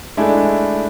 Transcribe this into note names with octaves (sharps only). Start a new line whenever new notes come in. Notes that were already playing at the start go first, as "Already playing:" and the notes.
G#3 A3 D4 E4